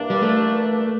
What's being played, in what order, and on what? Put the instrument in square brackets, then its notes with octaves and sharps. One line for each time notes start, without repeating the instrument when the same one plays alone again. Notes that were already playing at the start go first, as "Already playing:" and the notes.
Already playing: [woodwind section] G2 E3 A#3 D4
[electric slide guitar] G3
A3